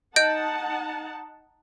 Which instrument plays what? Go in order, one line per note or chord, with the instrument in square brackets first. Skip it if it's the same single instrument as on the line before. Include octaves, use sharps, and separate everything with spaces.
[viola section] D#4 F#5 A5 [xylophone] D#5 G6 D7